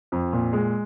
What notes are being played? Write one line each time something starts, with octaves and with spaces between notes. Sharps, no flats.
F2
A#2
G#3